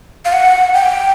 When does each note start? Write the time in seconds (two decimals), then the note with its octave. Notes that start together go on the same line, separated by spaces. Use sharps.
0.25 F5
0.33 F#5
0.74 G5